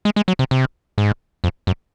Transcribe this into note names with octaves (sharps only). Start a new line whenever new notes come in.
G#3
G#3
F#3
C3
C3
G#2
F2
F#2